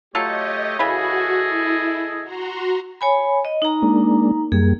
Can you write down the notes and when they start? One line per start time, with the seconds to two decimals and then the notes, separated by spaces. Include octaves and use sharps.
0.15 F#3 A3 F4 G4 A4 C#5 D#5
0.79 C#3 E3 F#4 G#4 A4 D#5 B5
1.38 E4
2.23 F#4 A#5 C6
3.01 C#5 G#5 B5
3.45 D#5
3.62 D#4 A#5
3.82 G#3 A#3 D4
4.52 F#2 G3 A#3 G#4